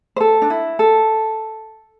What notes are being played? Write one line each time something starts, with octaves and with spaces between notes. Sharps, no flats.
C5
A4
D4
E4
A4